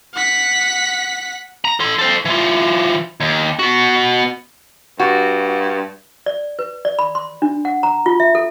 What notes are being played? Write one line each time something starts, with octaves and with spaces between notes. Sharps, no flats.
F#5 B6
A#5
A4 C6
A4 C5
E3 F4
D#2
B3 F#4
G2 F#4
D5
B4
D5
B5
C6
D4
F#5
A#5
F4
E5
A4